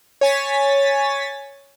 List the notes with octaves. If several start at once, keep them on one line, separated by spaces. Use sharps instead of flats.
C#5 G#5 A6 B6